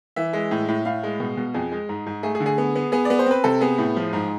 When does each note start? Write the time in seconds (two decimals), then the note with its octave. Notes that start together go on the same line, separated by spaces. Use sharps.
0.16 E3 E5
0.33 G#3
0.51 A2
0.68 A2
0.85 A2 F5
1.03 G#3
1.20 B2
1.37 B2
1.54 F2 G#4
1.72 G#3
1.89 G#2
2.06 G#2
2.23 A3 G#4
2.35 G#4
2.40 D3
2.46 G#4
2.58 B3
2.76 B3
2.92 B3 G#4
3.05 D5
3.10 B3
3.19 C5
3.26 C4 B4
3.44 C3 A4
3.61 B3 G#4
3.78 A2
3.96 F3
4.13 G#2